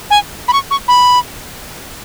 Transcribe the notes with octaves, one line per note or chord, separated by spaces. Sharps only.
G#5
B5
C#6
C#6
B5